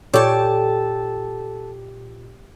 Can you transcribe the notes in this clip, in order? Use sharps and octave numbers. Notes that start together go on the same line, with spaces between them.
A#2 G4 A4 C#5 D5 G5 A5